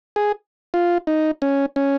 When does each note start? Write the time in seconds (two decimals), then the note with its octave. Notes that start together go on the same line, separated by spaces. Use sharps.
0.16 G#4
0.74 F4
1.07 D#4
1.42 C#4
1.76 C#4